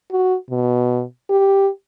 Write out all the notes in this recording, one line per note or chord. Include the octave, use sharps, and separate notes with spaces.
F#4
B2
G4